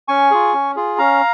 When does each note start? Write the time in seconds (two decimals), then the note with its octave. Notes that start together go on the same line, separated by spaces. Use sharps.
0.08 C#4 G#5 C#6
0.31 F4 G#4
0.53 C#4
0.76 F4 G#4
0.98 C#4 F5 A#5